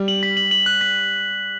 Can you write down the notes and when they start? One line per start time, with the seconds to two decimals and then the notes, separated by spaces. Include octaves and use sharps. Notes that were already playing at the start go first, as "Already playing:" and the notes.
Already playing: G3
0.08 F#7
0.23 B6
0.37 F#7
0.51 F#7
0.66 F#6
0.81 B6